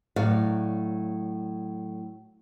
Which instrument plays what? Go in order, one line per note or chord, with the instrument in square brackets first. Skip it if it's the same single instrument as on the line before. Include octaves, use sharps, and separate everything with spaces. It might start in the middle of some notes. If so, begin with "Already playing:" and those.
[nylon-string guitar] A2 F#3 D5 F5